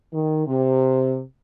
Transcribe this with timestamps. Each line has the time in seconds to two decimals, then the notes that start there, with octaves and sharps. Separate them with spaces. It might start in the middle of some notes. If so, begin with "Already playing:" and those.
0.13 D#3
0.47 C3